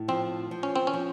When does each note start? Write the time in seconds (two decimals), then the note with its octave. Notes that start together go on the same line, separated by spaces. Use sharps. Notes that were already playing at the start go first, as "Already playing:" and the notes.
Already playing: A2
0.08 F3 C4
0.51 F3
0.63 C#4
0.76 C4
0.87 C#4
0.94 F3